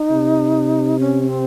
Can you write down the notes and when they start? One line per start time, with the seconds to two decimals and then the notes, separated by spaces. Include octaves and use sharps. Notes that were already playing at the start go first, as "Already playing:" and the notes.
Already playing: D#4
0.10 C3
0.99 C#4
1.29 C4